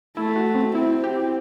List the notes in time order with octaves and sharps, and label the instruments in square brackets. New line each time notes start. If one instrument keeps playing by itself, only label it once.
[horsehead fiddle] A3 [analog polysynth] E4
[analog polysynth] F#4
C4
[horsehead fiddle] C4 [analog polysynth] E4
[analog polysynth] G4